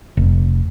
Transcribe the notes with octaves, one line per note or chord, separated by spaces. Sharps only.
F1